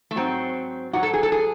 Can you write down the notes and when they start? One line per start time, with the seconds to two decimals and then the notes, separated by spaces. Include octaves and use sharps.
0.11 A3
0.16 G#2 F#3 C4
0.93 G#2 F#3 F#4
1.03 A4
1.13 G#4
1.23 A4
1.32 G#4